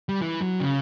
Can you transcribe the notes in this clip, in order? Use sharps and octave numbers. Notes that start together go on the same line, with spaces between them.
G3
E3
F#3
C#3